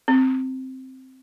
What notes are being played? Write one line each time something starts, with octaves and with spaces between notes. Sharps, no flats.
C4